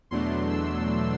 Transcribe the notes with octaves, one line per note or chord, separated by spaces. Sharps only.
E2 B2 F#3 A3 D4 C6
E6